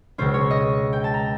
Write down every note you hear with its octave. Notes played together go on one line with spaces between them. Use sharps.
C#2 B2 G#3 C#4 C5
C#5
D#5
G5
A5
A#5